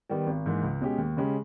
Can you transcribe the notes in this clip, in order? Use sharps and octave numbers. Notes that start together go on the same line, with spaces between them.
D#3 G3 B3
G#1
G#2 E3 A#3
C#2
B2 G#3 C#4 G4
D#2
C#3 G#3 C#4 G4